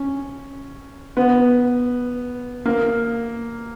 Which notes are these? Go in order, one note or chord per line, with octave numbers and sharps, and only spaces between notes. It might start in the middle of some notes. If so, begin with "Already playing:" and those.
Already playing: C#4
B3
A#3